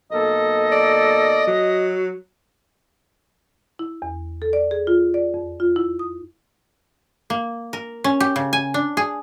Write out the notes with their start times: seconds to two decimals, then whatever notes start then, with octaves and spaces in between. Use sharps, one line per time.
0.11 B1 A#3 A4 D#5
0.72 D5
1.47 F#3
3.79 E4
4.02 E2
4.42 A4
4.53 D5
4.71 G#4
4.87 F4
5.14 D5
5.34 F2
5.60 F4
5.76 E4
5.99 D#6
7.30 A#3
7.73 A#4
8.04 C#4
8.20 G4
8.36 C#3
8.53 G#5
8.74 D4
8.97 G#4